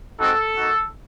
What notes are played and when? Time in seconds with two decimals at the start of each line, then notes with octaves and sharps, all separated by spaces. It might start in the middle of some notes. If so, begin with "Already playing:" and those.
0.18 G#3 C4 D#4 F#4 A4
0.57 A#3 D#4 F#4